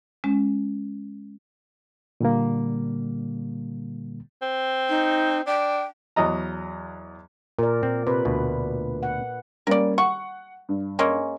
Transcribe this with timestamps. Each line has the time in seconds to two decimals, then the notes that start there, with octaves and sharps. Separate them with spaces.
0.24 G#3 C#4
2.21 A#2 D3 G3 A#3
4.42 C4
4.89 D#4
5.47 D4 G5
6.16 E2 F#3 D#5 A#5
7.59 A#2 A#4 D5
7.83 A#2 C4
8.07 C3 B4
8.25 D2 B2
9.03 F#5
9.67 G3 A#3 C#4 A#4 D5
9.98 F#5 C#6
10.69 G2
10.99 G#3 A#3 C#4